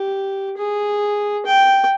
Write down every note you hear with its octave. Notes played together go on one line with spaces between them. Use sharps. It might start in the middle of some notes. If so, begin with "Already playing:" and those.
Already playing: G4
G#4
G5